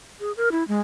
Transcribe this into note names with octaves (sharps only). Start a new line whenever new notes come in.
G#4
A#4
E4
G#3